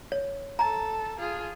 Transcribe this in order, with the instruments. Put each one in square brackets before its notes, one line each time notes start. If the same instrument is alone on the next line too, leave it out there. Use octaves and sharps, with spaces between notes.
[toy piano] C#5
[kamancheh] A4 A5 [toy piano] A#5
[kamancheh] F4 G#4